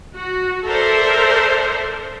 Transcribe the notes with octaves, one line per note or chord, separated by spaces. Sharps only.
F#4
A4 A#4 C5 D5 E5